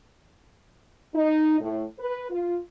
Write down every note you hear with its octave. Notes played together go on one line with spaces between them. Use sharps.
D#4
A2
B4
F4